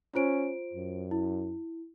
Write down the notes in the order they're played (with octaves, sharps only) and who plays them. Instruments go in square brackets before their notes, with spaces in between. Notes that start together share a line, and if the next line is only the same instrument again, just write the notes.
[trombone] C#4 [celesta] F4 C5 D7
[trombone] F#2
[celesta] E4